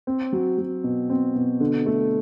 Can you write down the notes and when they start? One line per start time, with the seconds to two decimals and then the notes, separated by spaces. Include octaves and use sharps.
0.07 C4
0.33 F#3
0.58 F#3
0.84 B2
1.10 C4
1.35 B2
1.60 D3
1.86 A3